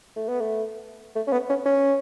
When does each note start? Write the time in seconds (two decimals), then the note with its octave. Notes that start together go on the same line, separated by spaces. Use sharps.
0.16 A3
0.28 B3
0.41 A3
1.16 A3
1.27 C#4
1.32 B3
1.49 C#4
1.65 C#4